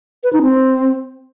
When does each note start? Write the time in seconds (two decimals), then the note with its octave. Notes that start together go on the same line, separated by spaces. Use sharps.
0.24 B4
0.33 D#4
0.42 C4